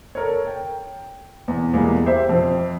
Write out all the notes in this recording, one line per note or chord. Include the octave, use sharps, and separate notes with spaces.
A4 A#4 C#5
G5
E2
E2 G3 G#3 A#3
G4 C5 E5
F2 C4 C5